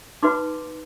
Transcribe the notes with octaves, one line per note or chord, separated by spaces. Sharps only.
D#4 F#4 B4 C6 D6